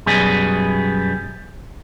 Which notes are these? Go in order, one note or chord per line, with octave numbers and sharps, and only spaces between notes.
F#2 B2 G3 B3 G#4